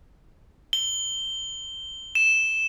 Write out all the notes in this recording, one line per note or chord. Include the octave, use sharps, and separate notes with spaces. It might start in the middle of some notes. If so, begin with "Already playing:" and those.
G7
E7